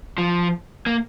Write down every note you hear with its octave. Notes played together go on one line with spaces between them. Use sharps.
F3
A#3